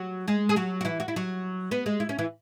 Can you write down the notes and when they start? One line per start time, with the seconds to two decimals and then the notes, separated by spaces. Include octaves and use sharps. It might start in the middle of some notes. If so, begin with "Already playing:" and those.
Already playing: F#3 F#4
0.28 G#3 G#4
0.49 G#4
0.56 F#3 F#4
0.81 F#4
0.85 E3 E4
1.00 F#4
1.08 E4
1.16 F#3 F#4
1.71 B3 B4
1.86 G#3 G#4
2.00 E4
2.09 C#4
2.19 E3 E4